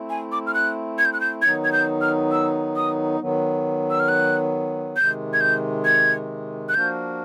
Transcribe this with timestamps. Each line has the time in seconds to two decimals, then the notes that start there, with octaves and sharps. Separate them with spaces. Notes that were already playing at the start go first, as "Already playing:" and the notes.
Already playing: A3 C4 E4
0.10 G#5
0.32 D6
0.47 F6
0.54 F#6
0.99 G#6
1.05 G6
1.13 F#6
1.21 G6
1.42 D#3 F#3 B3 D#4 G#6
1.65 G#6
1.73 G6
2.01 F6
2.32 E6
2.76 D#6
3.20 D#3 F#3 B3
3.91 E6
4.00 F6
4.09 F#6
4.96 C3 D#3 G#3 G6
5.33 G#6
5.41 G6
5.85 G#6
6.69 F#6
6.74 F3 A#3 D4 F#4 A#4 G6